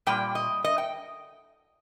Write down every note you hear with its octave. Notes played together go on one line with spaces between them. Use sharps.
A#2 G3 G5
D#5
D#5
G5